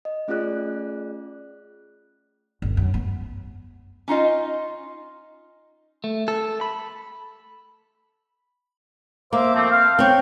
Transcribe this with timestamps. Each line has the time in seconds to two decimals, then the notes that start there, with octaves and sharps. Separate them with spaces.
0.05 D#5
0.28 A3 C#4 F4 G#4 D5 F#6
2.62 G1
2.77 F#2
2.94 B3
4.08 C#4 D#4 F4 D#5
6.04 A3
6.28 A4
6.61 B5
9.33 A#3 C5 E5 D6
9.55 F3 A3 C4
9.71 F5
9.99 C4 C#5 G5